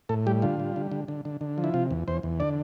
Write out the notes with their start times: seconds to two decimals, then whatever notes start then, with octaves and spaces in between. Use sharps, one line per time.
0.09 A2 A4
0.27 G3 G4
0.42 D3 F4
0.60 G3
0.76 D3
0.92 D3
1.08 D3
1.25 D3
1.41 D3
1.58 F3
1.64 E4
1.74 C3 F4
1.91 E2
2.08 E2 C5
2.23 E2
2.40 D3 D5